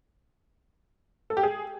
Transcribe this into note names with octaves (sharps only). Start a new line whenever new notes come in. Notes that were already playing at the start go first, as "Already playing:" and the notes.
A4
G4
G#4